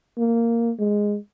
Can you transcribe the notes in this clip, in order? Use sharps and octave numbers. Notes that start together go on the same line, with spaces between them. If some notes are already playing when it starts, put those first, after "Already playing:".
A#3
G#3